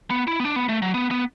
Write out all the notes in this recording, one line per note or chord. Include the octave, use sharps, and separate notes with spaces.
B3
E4
B3
D4
B3
A3
F#3
B3
B3